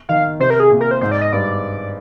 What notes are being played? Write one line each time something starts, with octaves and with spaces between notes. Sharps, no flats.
D#3 F5
C3 C5
A#4
G#4
A#2
A#4
C5
G#2 C5
D5
D#5
G2 D5